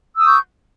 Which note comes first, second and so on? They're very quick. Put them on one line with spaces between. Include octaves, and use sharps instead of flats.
E6 D#6 C#6 G6